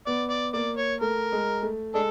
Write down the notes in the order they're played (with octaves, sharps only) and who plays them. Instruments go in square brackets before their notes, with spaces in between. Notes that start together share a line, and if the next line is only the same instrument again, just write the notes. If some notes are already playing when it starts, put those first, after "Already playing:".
[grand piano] B3 [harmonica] D5
[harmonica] D5
[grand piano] A#3 [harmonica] D5
[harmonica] C#5
[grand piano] A3 [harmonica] A#4
[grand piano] G#3
A3
[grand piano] G#3 [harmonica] D4 A4